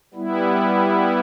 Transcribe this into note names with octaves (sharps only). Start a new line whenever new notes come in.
G3 B3 E4